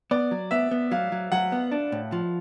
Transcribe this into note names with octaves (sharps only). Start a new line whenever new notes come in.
B3 D5
F#3
B3 E5
B3
F#3 F5
F#3
F#3 F#5
B3
D4
A2
F3